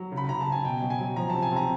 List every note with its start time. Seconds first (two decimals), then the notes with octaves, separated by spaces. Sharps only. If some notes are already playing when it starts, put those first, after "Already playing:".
Already playing: F#3
0.12 C#3
0.17 B5
0.29 C#3 A#5
0.41 A5
0.47 C#3
0.52 G#5
0.64 B2 G5
0.82 F#3
0.90 G#5
1.00 F#3
1.16 F3 A#5
1.30 A5
1.34 C3
1.42 G#5
1.52 C3 A#5